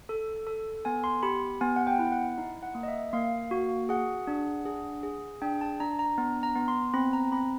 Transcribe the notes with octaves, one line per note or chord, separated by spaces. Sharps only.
A4
A4
B3 G#5
C6
G4 B5
B3 G#5
F#5
G5
E4
F#5
D#4
F#5
A#3
D#5
E5
A#3 F5
F#4
G#4 F#5
D4
G#4
G#4
D4 G5
A5
D4 A#5
A#5
B3
A#5
B3
C6
C4 B5
A#5
C4 B5